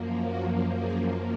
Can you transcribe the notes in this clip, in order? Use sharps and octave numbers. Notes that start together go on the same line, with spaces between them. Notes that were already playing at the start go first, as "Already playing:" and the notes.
Already playing: F#2 F3 A#3
F#4
G#4